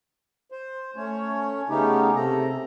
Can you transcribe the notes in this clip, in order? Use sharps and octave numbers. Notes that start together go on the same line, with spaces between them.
C5
A3 C#4 C#5
C#3 A3 B3 C#4 D#4 G4
C3 A4 A#5